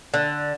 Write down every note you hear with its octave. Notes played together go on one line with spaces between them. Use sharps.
D3